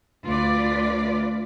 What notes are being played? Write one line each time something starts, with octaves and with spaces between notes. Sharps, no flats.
D2 F4 B4 D5